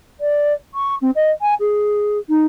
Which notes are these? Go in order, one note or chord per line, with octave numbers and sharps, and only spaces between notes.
D5
C#6
C4
D#5
G#5
G#4
D#4